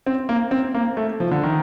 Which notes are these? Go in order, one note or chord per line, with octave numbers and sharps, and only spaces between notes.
C4
A#3
C4
A#3
A3
F3
D3
D#3